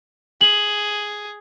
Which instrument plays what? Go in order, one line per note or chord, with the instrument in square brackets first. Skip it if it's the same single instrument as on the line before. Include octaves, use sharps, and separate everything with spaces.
[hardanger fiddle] G#4 [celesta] F#7